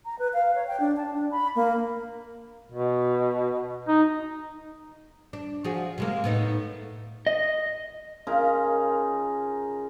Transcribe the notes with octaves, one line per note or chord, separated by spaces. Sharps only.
A#5
B4
F5
C#5
G5
D4
A5
D4
B5
A#3
B2
D#4
D4
F3 F#4 G#4
C3 G#3 A#3
A2 B3 D#4
D#5
C#3 D#4 F4 A#4